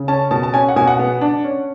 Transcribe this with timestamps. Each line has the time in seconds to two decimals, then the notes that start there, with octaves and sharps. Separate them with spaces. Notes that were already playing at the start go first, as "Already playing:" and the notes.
Already playing: C#3
0.08 C#4 A5
0.31 B2 A5
0.43 A5
0.54 C#4 G#5
0.69 F#5
0.76 B2 G#5
0.87 F#5
0.99 B3
1.21 D4
1.44 C#4